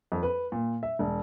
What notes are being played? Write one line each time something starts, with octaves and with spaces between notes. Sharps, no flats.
F2
B4
A#2
E5
E1